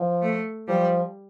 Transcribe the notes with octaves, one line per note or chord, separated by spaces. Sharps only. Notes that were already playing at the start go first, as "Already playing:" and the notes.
Already playing: F3
A3
F3 G3